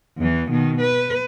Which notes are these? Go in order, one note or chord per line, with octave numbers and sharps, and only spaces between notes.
E2 E3
B2 D#3
B4